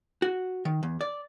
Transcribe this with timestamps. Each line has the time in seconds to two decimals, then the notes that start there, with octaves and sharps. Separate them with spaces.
0.22 F#4
0.65 D#3
0.83 E2
1.01 D5